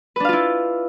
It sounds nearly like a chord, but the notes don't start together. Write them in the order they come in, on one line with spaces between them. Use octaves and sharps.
B4 D4 F5 F4 E4